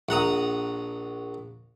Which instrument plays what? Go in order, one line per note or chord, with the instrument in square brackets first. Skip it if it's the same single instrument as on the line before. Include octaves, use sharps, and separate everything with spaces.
[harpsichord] A#1 F#5 A#5 D#6